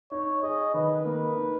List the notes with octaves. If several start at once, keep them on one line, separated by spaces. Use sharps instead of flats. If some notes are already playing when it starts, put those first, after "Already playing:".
D#4 C#5
G#4 D#5
D#3 B4
A#3
D#4